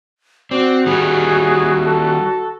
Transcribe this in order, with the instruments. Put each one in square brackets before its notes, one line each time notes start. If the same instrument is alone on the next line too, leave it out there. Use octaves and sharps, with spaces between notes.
[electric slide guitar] C4 [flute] F#4 [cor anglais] D5
[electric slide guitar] D#3 G3 [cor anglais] G#4
[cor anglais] A4